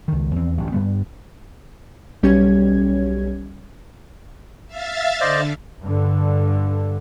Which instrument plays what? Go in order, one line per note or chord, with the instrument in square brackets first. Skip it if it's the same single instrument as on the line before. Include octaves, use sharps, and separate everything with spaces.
[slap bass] C#2 D#3
E2 C4
A1 D2 G2
G2 G3 B3
[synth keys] B1 G3 C#4 G4 C#5 G#6
[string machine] E5 F5 A6
[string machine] D3 [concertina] C5 D5 D#5
[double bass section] G2 D3